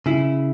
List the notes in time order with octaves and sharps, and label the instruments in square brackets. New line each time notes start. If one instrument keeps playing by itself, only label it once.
[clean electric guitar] C#3 [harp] E4